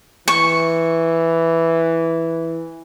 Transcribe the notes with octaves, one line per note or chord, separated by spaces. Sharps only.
E3 C#6